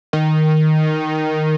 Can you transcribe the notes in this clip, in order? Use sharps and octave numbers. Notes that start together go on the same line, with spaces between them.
D#3